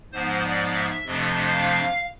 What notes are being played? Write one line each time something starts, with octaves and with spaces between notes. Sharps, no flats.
G#2 F3 G#3 B3 C5
D5
E5
F2 C3 F3 A3 D4 D#5
F5